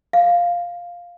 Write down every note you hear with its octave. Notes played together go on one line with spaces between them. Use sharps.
F5